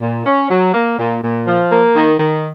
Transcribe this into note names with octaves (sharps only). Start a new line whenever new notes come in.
A#2
C#4
F#3
A#3
A#2
A#2
F3
A#3
D#3
D#3